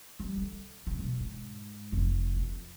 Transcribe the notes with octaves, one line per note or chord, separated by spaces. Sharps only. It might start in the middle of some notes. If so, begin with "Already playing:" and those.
G3
D3
C3
B1
G#2
F1
F2